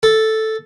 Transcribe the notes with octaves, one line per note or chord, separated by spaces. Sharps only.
A4